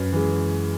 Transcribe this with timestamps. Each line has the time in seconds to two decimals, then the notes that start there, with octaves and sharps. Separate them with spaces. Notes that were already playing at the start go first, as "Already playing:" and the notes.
Already playing: F#2 B4
0.13 E3 G#3